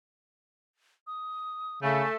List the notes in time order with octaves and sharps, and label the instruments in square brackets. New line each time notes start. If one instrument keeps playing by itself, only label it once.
[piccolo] D#6
[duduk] C#3 [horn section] A3 [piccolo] G#5